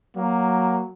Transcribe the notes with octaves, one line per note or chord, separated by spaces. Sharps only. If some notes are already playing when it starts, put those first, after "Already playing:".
F#3 A#3